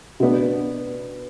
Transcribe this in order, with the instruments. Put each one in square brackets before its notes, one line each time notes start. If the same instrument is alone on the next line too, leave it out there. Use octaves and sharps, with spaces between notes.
[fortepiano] B2 B3 D4